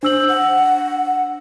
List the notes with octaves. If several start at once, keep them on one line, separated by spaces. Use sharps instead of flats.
D4 C5 E6 F#7
F#5